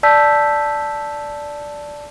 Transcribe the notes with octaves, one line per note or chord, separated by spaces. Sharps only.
D5 A5 E6 G6 B6